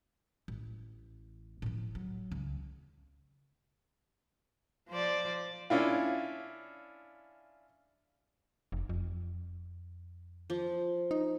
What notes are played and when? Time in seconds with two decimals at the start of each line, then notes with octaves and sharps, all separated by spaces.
0.48 A1
1.62 A2 F3
1.95 F#3
2.31 C#2 C#3
4.89 F3 C5 D5
5.70 C#4 D4 E4 F4
8.72 F1
8.89 F2
10.50 F3
11.11 D#4